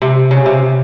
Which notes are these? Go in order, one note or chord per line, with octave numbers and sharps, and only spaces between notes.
C3
C#3
C3